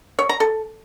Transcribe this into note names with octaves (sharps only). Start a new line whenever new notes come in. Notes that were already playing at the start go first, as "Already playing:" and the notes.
C#5
A#5
A4